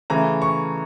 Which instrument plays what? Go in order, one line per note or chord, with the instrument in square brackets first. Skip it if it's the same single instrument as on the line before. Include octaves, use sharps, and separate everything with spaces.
[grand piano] C#3 E3 A3 A#5
C#6